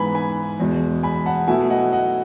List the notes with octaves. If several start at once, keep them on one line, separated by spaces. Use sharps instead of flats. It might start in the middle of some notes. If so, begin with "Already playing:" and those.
Already playing: G#2 E3 B3 G#5 B5
G#5 B5
E2 B2 G#3
G#5 B5
F#5 A5
B2 F#3 A3 E4 E5 G#5
D#5 F#5
D#5 F#5